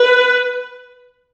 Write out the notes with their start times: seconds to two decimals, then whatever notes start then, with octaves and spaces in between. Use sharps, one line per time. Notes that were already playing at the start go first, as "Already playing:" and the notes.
Already playing: B4